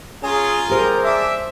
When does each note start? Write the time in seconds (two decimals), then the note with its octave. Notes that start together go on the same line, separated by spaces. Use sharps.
0.23 C#4 F4 G#4 G#5 A#5
0.70 G4 G#4 A#4 C5
1.04 D4 E5